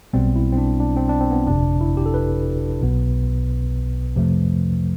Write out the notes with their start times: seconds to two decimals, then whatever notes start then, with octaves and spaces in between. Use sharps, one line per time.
0.13 B1 B2 G3 B3 C4
0.36 E4
0.52 C4
0.58 D4
0.80 D4
0.97 C4
1.09 D4
1.21 C4
1.31 B3
1.47 G1 F2 C3 D4
1.81 E4
1.97 G4
2.06 A4
2.14 B4
2.82 B1 B2 B3
4.15 F2 C3 F3 A3